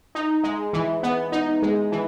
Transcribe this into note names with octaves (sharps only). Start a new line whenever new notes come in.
D#4
G#3
E3
B3
D#4
G#3
E3